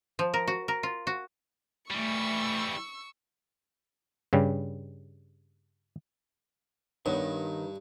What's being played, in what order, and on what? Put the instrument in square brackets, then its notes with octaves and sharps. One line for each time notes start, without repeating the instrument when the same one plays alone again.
[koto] F3
A#4
F#4
A#4
F4
F#4
[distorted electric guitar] E3 G3 [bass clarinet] A3 [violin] C#6 E6
[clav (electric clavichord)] G2 C#3 G3
[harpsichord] G2 [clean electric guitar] D#3 [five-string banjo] B3 B4 C#5